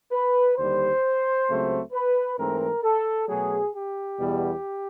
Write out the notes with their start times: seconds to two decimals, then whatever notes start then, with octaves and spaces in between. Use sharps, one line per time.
0.12 B4
0.58 D#2 D3 G3 C5
1.48 C#2 C#3 F#3 A3 C4
1.93 B4
2.38 G#2 E3 A3 C4 A#4
2.83 A4
3.28 B2 F#3 A3 G#4
3.74 G4
4.19 E2 B2 G3 B3